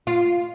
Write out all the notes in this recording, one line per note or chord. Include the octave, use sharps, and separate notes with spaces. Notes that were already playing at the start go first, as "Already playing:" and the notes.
F4